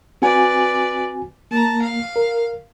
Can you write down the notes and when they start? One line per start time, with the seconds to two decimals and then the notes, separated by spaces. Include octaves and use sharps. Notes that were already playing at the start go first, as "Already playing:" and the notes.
0.22 C4 F#4 B4 D5 G#5
1.51 A#3 A5 A#5
1.82 F5
2.16 A#4